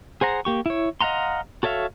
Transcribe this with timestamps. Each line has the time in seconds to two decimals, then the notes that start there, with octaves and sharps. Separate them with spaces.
0.21 G#4 C5 F#5 A#5
0.45 A#3 G4 C#6
0.66 E4 C#5
1.01 D#5 F5 F#5 A#5 C6
1.63 F#4 A4 C#5 E5 F5